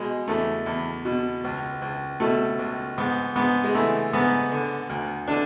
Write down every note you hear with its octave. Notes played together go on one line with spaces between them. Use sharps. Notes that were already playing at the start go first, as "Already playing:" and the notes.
Already playing: B2 G#3
E2 A3
E2
B2
C#2
C#2
B2 A3
C#2
G#2 B3
G#2 B3
G#3
E3 A3
G#2 B3
D3
D2
D3 D4